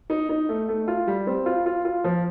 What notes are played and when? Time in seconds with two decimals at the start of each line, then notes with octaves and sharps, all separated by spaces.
0.10 D#4
0.29 D#4
0.49 A3
0.69 A3
0.88 F4
1.07 G3
1.27 C4
1.46 F4
1.66 F4
1.85 F4
2.04 F3